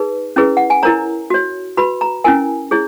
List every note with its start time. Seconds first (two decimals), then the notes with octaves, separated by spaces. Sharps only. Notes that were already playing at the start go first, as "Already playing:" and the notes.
Already playing: D#4 G#4 B4
0.36 C#4 E4 G#4 B4
0.57 F#5
0.70 G#5
0.83 E4 A#4 C#5 A#5
1.30 F#4 C#5
1.77 F#4 B4 B5
2.01 A#5
2.24 C#4 E4 A#4 G#5
2.71 E4 G#4 C#5